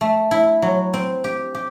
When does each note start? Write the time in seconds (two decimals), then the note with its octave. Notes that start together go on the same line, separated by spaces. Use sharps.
0.01 A3
0.31 E4
0.62 F#3
0.94 C4
1.24 G4
1.55 G4